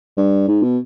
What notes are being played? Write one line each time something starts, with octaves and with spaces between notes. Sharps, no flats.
G2
G#2
B2